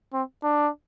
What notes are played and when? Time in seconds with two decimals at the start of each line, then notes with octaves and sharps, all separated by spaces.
0.14 C4
0.43 D4